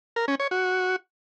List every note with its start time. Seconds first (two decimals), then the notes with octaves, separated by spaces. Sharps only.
0.16 A#4
0.28 C#4
0.40 C#5
0.51 F#4